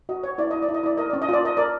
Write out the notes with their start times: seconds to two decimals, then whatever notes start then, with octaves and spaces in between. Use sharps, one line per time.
0.09 F#4 D#5
0.23 C#5
0.38 E4 D5
0.51 E4 D#5
0.62 D5
0.69 E4
0.74 D#5
0.83 E4 D5
0.97 A#4 D#5
1.10 C#4 D5
1.22 D#5
1.29 F4 D5
1.43 A#4 D#5
1.57 A#4 D5